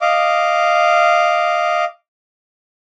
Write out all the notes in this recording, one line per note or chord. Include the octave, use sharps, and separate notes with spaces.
D#5 F5 D6